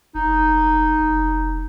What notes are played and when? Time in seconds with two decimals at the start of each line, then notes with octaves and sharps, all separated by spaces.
0.15 F1 D#4
1.00 F1